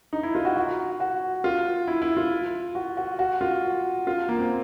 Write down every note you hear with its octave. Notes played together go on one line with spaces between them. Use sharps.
D#4
E4
F4
F#4
F#4
F#4
F4
E4
E4
F4
F#4
F#4
F#4
F4
F4
A#3
C4